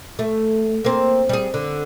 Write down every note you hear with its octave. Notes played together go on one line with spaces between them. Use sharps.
A3
A#3 C4
G3 G#4
D3